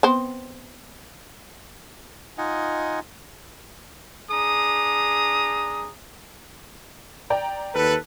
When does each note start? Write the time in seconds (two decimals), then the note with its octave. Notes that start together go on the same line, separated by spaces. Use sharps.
0.03 B3 C4 C5
2.38 D#4 F4 D#5 F#5 G#5
4.31 D4 G#4 A#5 D#6
7.30 D5 G5 A#5
7.74 D#2 A4 B4